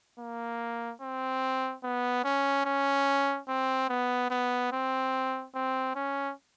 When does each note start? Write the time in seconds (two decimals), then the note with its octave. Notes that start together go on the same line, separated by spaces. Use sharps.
0.19 A#3
1.01 C4
1.84 B3
2.25 C#4
2.66 C#4
3.48 C4
3.89 B3
4.30 B3
4.72 C4
5.55 C4
5.96 C#4